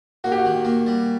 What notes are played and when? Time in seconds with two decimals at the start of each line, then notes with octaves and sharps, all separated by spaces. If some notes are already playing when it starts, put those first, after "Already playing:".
0.24 A#3 F#4
0.32 G4
0.38 F#4
0.45 D#3
0.65 A#3
0.86 G3